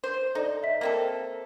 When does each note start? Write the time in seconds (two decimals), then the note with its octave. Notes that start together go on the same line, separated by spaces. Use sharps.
0.04 C5
0.35 D#4 A4 D5
0.63 E5 B6
0.81 A#3 C4 A4